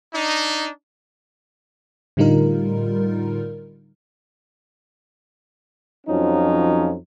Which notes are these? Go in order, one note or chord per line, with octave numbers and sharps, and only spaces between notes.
D4 D#4
A2 D3 G3 D#4 F4 A#4
F2 F3 F#3 C#4 D#4